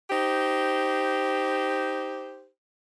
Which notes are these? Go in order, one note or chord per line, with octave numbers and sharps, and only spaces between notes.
D#4 G4 C5